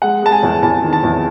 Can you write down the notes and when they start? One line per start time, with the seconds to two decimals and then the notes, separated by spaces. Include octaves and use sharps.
0.02 G#3 F#5
0.22 G#3 A5
0.32 G#5
0.43 E2
0.63 E2 A5
0.83 D#3
0.93 A5
1.03 E2